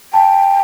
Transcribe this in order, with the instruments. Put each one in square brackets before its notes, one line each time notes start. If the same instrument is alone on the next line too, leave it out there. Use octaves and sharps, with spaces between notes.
[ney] G5 [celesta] A5